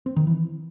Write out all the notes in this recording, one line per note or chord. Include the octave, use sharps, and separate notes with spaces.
C4
D#3
E3